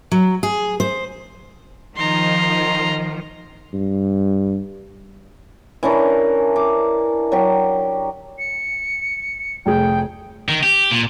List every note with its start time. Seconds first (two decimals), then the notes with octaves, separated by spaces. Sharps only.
0.12 F#3
0.43 G#4
0.80 C5
1.97 D#3 F3 A#5 C6
3.73 G2
5.83 E3 C#4 D4 A#4
6.56 D6
7.32 F#3 G4
8.39 C#7
9.66 F1 A3 G#4 G5
10.49 D#3
10.63 G4
10.91 A#2